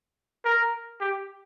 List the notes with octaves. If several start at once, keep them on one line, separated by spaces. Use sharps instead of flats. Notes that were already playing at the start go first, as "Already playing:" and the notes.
A#4
G4